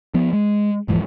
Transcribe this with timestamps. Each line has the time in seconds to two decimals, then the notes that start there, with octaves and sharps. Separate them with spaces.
0.14 F3 B3
0.33 G#3
0.88 D#1 G#2 E3 F3